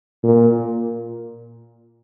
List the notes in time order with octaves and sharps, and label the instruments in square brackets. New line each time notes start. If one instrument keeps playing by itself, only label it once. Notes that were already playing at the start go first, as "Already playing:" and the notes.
[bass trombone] A#2